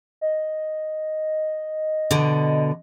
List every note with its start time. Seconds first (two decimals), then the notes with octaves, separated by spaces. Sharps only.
0.21 D#5
2.11 B2 D3